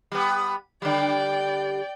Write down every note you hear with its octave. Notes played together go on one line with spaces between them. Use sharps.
G3 B3
D3 G3 D5 G5